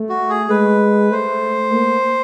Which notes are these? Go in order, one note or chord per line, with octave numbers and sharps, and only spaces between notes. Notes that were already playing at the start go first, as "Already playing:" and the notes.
Already playing: A3
F#4
G#4
G#3 B4
A3 C5
A#3